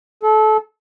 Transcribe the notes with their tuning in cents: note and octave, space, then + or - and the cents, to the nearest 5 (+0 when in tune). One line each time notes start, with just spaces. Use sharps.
A4 -25